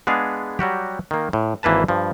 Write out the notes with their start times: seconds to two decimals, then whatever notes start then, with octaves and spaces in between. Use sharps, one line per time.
0.07 G#3 B3 D4 G#4 F5
0.59 F#3 G3 F#4 G4
1.11 D#3 A#3
1.33 A2
1.63 G#1 E3 A#3 B4 A5
1.88 G2 F3